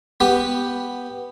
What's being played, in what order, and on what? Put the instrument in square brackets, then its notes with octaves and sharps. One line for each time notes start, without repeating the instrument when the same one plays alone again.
[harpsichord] B3 G4 B4